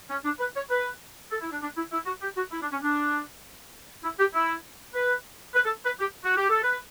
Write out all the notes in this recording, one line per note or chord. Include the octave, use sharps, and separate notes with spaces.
C#4
D4
B4
C#5
B4
A4
E4
D4
D4
E4
E4
F#4
G4
F#4
E4
D4
C#4
D4
E4
G4
E4
B4
B4
A4
B4
G4
F#4
G4
A4
B4